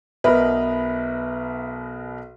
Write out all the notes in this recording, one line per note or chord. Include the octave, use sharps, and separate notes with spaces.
B1 B2 A#4 B4 E5